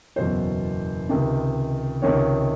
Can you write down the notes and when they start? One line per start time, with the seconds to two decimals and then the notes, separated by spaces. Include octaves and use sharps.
0.16 F#1 E2 B2 F#3 C5
1.09 C#2 C3 D#3
2.02 C#2 C3 D#3 C#5